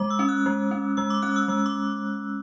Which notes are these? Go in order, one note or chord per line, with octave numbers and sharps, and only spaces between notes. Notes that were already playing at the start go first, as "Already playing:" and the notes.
Already playing: G#3 D6
E6
C#4
F#6
G#3
C#4
G#3 E6
D6
C#4 F#6
E6
G#3 E6
D6